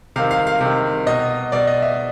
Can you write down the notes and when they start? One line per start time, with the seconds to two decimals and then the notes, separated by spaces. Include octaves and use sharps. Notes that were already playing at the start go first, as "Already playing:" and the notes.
0.16 C3 D#3 F5
0.31 F5
0.47 F5
0.61 C3 D#3
1.07 B2 D#5
1.52 B2 D5
1.67 D#5
1.82 E5